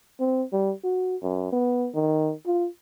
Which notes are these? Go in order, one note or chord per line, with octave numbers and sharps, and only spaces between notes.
C4
G3
F#4
F#2
B3
D#3
F4